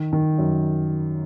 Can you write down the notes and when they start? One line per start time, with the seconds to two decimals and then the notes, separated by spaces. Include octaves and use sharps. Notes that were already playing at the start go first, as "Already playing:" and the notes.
Already playing: D#3
0.12 D#3
0.38 F#2